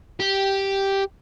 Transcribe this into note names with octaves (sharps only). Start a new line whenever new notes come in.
G4